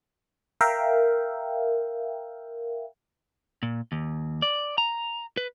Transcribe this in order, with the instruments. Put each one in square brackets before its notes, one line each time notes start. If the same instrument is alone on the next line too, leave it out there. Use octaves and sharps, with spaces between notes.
[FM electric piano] A#4 E5 F5 G5
[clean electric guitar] A#2
D#2
D5
A#5
B4